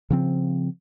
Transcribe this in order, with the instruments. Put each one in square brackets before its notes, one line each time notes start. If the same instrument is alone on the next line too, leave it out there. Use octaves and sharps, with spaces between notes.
[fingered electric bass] C#3 F3 C4